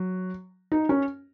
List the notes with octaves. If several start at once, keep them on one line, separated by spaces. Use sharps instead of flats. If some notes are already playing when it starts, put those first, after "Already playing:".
Already playing: F#3
D#4
C#4